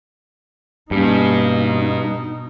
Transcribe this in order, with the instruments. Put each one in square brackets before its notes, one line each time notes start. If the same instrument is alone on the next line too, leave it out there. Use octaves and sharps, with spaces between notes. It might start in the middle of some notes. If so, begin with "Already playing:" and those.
[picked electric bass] G2 [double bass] B2 D#4 [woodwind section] A#3 C#4